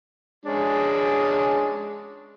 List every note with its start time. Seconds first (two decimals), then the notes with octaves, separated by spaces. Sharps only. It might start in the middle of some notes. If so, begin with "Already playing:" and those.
0.45 G#3 C#4 D4